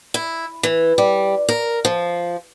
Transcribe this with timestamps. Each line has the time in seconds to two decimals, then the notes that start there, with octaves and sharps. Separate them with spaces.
0.14 E4
0.63 E3
0.98 G3
1.49 A#4
1.85 F3